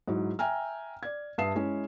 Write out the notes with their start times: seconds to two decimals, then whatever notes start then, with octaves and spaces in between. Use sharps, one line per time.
0.08 G#2 F#3 E4
0.39 E5 G5 G#5 A#5 F6
1.03 D5 G#6
1.38 G2 E5 A5 D#6 C7 E7
1.56 G#3 C#4 E4